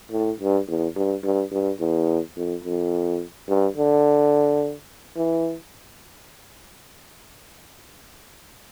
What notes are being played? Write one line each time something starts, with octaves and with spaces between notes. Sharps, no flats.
A2
G2
E2
G2
G2
G2
E2
F2
F2
G2
D3
E3